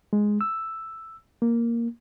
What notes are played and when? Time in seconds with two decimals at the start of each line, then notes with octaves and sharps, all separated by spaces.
0.13 G#3
0.41 E6
1.42 A#3